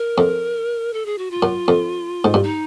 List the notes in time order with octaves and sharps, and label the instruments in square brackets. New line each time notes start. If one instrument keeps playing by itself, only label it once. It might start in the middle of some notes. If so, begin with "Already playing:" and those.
Already playing: [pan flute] A#4
[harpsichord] F2
[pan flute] A4
G#4
F#4
F4
[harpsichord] F#2
F2
G#2
G2
[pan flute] D#4